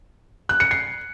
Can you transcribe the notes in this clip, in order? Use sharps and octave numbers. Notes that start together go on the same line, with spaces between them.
F#6
C#7
C7